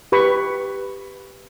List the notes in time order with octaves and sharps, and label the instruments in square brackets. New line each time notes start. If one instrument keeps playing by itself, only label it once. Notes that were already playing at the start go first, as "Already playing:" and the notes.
[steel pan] G4 B4 B5 C#6